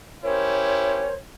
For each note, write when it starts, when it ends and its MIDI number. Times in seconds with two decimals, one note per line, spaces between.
0.23 1.08 61
0.23 1.08 64
0.23 1.08 67
0.23 1.13 70
0.23 1.13 72
0.23 1.13 73